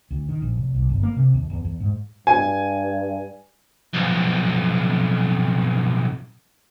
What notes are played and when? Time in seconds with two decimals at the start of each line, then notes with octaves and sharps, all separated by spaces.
0.11 D2
0.29 D#3
0.42 A#1
0.57 F1
0.75 C2
0.90 G1
1.03 A#3
1.16 C3
1.34 D#2
1.50 E2
1.65 E2
1.80 G#2
2.27 G2 G#5
3.93 B1 F2